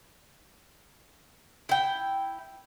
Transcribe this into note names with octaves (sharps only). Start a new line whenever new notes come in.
E4 G5